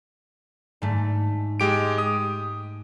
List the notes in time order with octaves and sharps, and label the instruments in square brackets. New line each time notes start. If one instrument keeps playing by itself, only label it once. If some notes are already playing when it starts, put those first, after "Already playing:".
[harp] G#2 A3
[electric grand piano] G#3 G4 D7
D#6